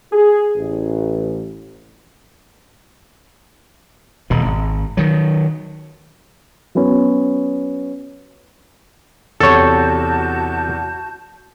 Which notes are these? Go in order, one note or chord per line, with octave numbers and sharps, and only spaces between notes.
G#4
A1
D#1 B2
G#1
D#3 F#3
F#3 B3 C#4
E2 C3 F#4 A4 C#5 A5 G6